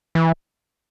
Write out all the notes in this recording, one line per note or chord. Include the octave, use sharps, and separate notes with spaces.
E3